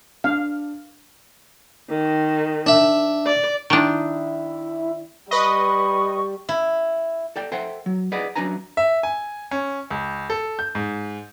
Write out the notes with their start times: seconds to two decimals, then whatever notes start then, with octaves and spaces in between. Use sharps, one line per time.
0.24 D4 F5
1.90 D#3
2.67 D4 E5
3.26 D5
3.70 D#3 D4 E4
5.31 G3 B4 D#5 B5 C#6
6.49 E4
7.36 A4 D5 G5
7.52 A4 C5 E5 F#5 G5
7.86 F#3
8.12 G#4 B4 D5 D#5 F#5
8.35 F#2 B3 D4 B4 G#5 A#5
8.77 E5
9.03 G#5
9.51 C#4
9.90 C#2
10.30 A4
10.59 G6
10.75 G#2